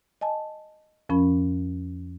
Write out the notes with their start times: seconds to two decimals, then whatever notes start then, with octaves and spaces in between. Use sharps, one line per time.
0.21 D#5 G#5 A5
1.09 F2 F3 C#4 A#4 B5